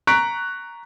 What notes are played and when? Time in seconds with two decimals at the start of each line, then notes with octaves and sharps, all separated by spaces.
0.07 A#5 C#6 F#6 B6 D7